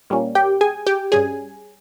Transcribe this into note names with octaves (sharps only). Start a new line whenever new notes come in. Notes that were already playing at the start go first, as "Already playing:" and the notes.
A#2 G3 A#3 C#4
G4 G5
G#4 G#5
G4 G5
G2 G3 C#4 G#4 G#5